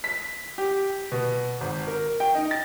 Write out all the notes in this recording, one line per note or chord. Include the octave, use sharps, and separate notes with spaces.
B6
G4
B2
G#1
A#4
G5
D#4
A6